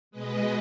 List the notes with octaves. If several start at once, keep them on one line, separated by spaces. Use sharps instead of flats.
B2 G#3 B4 D#5